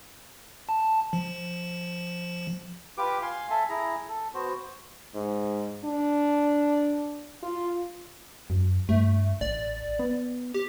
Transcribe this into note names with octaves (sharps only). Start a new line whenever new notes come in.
A5
F3
F4 G4 B4 D6
F5 G#5 C6
A4 E5 G#5 A5
E4 G#4 A#5
A4
B3 F#4 C5
G#2
D4
F4
F#2
G2 A3
A1 D5
B3
G4